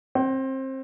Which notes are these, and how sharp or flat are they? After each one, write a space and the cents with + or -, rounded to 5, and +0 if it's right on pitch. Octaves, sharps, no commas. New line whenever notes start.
C4 +25 G5 -30